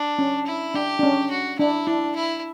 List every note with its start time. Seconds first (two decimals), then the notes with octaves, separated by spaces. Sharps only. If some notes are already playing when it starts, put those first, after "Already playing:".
Already playing: D4
0.19 C#4
0.47 E4
0.74 D4 G4
0.99 D4
1.03 C#4
1.31 F#4
1.59 D4 E4
1.87 D4 E4
2.15 E4